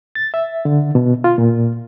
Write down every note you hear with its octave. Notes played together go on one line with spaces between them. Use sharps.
A6
E5
D3
B2
F4
A#2